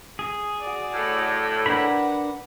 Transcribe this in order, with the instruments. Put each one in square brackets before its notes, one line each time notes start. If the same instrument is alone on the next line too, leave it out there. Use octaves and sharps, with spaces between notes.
[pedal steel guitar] G#4
[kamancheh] F#4 D5
[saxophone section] A2
[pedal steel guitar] D4 A#4 B5 [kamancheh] B4 F#5